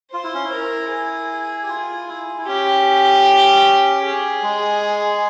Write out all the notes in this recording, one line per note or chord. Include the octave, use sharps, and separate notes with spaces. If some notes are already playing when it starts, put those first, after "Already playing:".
F4 C5
E4
C#4
E4
A#4
G#4
G4
F4
E4
F4
E4
C#4 G4
G#4
G#3